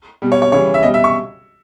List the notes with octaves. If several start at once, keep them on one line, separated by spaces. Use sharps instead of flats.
B2 G3
C#5
C#5
C#3 E3 G3 C#5
E5
B2 G3 D#5
E5
C#6